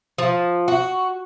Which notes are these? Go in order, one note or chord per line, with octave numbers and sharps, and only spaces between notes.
F3
F#4